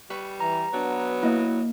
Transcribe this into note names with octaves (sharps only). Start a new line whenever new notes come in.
G3 B4 C#6
E3 A#5
F#3 B3 D4
A#3 E4 D#5